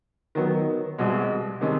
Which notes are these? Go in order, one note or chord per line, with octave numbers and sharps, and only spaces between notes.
D#3 F#3 B3
C2 B2 G#3
C3 D#3 G#3 C#4